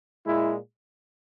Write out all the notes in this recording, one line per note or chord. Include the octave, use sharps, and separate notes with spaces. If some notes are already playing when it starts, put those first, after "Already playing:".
A#2 G#3 E4